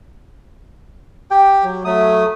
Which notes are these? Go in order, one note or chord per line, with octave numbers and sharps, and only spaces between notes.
G4 G5
F#3
F#3 A3 D#6